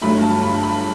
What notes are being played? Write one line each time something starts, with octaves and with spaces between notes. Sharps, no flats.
G1 G2 F#3 A3 B5
A5
B5
B5